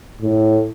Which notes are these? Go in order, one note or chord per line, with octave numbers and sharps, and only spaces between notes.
A2